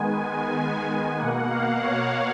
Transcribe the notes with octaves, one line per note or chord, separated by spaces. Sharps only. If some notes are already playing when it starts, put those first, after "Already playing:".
Already playing: D#3 G#3 B3 G#5
B2 A#3 F#5
F5
C#5